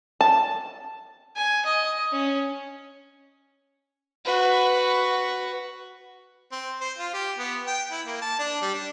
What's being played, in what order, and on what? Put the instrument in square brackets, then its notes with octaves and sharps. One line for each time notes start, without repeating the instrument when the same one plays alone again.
[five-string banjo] A5
[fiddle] G#5
D#5
C#4
F#4 B4
[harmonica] C4
C5
F4
G4
B3
G5
E4
A#3
A5
D4
G3
D4